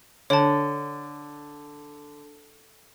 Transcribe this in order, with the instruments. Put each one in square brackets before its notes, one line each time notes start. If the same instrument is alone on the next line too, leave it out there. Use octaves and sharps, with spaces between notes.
[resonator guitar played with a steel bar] D3 [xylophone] C#5 A5